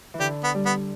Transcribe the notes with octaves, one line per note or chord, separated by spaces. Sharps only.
E3
D3 G4
B3
G3
B3